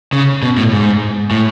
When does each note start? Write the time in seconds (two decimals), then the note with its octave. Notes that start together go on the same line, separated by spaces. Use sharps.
0.13 C#3
0.43 B2
0.57 A2
0.73 G#2
1.31 A2